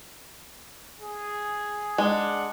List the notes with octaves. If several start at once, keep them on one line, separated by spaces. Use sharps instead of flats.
G#4
G#3 D4 F#5